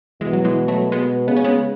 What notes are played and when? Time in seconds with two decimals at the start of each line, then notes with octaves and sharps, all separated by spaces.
0.21 B2 E3 G#3
0.33 F#3
0.45 E3 G#3
0.68 F#3 A3
0.92 B2 G#3 B3
1.28 C#3 B3
1.36 C#4
1.44 G#3 B3